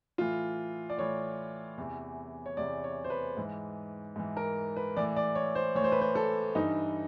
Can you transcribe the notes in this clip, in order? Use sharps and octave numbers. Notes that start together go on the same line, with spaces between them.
A2 E3 F4
D5
A2 E3 C#5
E2 C3 E3
C#5
E2 C3 E3 D5
C#5
C5
B4
G#2 E3
G#2 E3
A#4
B4
A2 E3 D5
D5
C#5
C5
A2 E3 C#5
C5
B4
C5
A4
G2 E3 D#4